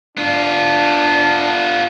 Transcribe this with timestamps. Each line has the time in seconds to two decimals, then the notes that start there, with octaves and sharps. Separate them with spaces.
0.17 B3 D4 F4